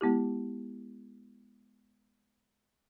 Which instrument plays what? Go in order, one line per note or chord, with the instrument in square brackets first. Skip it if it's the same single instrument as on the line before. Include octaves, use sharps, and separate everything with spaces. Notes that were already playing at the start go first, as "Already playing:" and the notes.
[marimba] G#3 B3 E4 G4